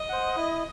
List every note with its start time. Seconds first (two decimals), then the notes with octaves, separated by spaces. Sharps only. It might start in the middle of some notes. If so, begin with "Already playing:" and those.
Already playing: D#5
0.09 C5 F#5
0.36 E4